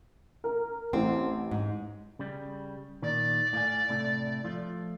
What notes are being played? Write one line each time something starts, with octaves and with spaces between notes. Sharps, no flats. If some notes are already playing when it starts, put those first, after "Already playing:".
A#4
A1 C4
G#2
C#3 G3
A#2 D#3 D5
A2 F5 G#5
A2 C3 A3
F3 A3 F4